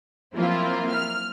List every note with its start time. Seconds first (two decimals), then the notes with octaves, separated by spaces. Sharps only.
0.34 F3 F#3 A#3 C4 E4 F4
0.91 F6